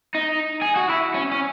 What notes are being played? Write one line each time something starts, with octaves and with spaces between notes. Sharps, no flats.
D#4
G#4
F#4
E4
C#4
C#4